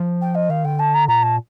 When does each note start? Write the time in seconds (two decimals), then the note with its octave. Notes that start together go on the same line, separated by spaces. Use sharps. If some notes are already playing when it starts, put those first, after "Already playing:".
Already playing: F3
0.21 G5
0.35 D#5
0.49 D#3 F5
0.64 D3 G5
0.79 A5
0.94 A#5
1.08 A#2 A#5
1.22 A5